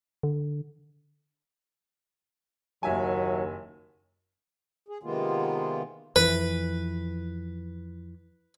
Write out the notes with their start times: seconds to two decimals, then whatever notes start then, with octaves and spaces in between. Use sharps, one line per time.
0.23 D3
2.83 F#1 D#2 F#3 E5 G#5
4.89 G#4
5.03 C3 D#3 G#3 A#3 B3 F4
6.16 F2 E3 B4